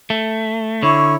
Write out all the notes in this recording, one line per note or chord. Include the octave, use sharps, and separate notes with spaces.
A3
D3 E4 C#5 C#6